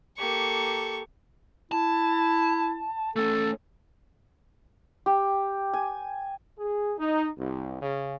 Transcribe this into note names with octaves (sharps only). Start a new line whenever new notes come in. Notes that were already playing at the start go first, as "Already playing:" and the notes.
A#3 G4 A4 C#6
E4 A5
A3 C#4 A4
G4
G#5
G#4
D#4
C2
C#3